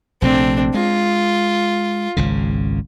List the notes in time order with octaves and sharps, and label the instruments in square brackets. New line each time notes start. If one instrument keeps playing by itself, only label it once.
[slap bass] A#1 C3 A3 [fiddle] C4 D4
[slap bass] G#3 [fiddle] F4
[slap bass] G#1 C#2 C#3